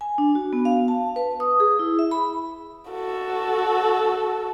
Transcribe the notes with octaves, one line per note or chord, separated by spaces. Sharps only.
G#5
D4
F#4
B3
F5
A5
B4
D#6
G#4
E4
E5
B5
F#4 A4